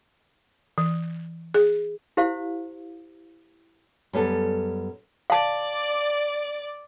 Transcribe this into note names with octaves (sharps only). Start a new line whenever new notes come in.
E3
G#4
E4 G4 C5 F5
F#2 G3 B3 A4
D5 F5 A5